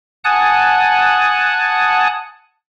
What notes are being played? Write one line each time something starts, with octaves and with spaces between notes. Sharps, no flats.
F#5 G#5 A5 D#6 F#6